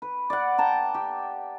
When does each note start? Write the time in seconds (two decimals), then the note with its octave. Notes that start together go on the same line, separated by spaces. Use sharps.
0.02 B4
0.30 D5 F#5
0.58 G5 A5 A#5
0.94 G4